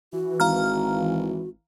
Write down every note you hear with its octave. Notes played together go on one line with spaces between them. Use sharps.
E3 F#4
G#1 F5 A#5 F6